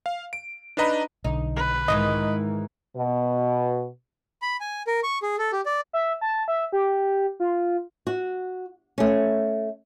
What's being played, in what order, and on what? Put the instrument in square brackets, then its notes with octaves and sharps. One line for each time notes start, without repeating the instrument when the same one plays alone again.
[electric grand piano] F5
D7
D4 D#4 B4 D#5 A#5 B5
[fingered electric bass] B1 D3 [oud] D#4
[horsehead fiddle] B4
[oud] G#2 D#3 E3 [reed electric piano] D#5
[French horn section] B2
[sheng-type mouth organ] B5
G#5
A#4
C#6
G#4
A4
G4
D5
[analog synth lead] E5
A5
E5
G4
F4
[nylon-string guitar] F#4
A3 C#4